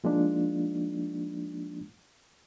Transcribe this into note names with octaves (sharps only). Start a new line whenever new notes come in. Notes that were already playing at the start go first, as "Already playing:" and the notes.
F3 G#3 A#3 D4 D#4 F4